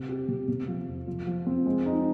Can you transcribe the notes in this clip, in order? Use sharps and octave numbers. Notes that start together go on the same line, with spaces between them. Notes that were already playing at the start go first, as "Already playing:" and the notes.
Already playing: C3
G4
C3
C3
F3
F2
F3
F3
C4
G#3
D#4